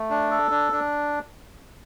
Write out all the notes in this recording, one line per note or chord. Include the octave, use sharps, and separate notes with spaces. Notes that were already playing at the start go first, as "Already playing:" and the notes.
Already playing: A3
D4
A4
D4
D4